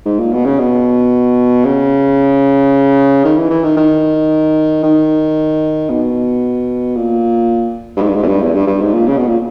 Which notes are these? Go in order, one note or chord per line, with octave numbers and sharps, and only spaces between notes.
G#2
A#2
B2
C#3
B2
C#3
D#3
E3
E3
D#3
D#3
D#3
B2
A#2
G2
G#2
G2
G#2
E2
G2
E2
G2
G2
G#2
A#2
C#3
B2
A#2